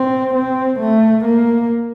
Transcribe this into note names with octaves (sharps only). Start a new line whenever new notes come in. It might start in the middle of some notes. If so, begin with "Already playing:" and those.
Already playing: C4
C4
A3
A#3